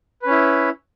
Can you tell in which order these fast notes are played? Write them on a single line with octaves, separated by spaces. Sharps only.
B4 C#4 E4